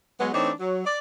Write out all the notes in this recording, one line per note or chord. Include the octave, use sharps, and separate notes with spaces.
F#3 G#3 B3
E3 A3 C4 D4 D#4 C#5
F#3
D5